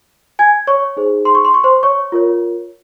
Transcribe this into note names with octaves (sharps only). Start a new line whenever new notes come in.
G#5 G#6
C#5 C#6
D#4 G#4 C5
C6
C#6
C6
C#6
C5 C6
C#5 C#6
F4 A#4 C#5